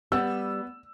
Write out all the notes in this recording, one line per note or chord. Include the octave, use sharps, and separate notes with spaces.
G3 B3 E6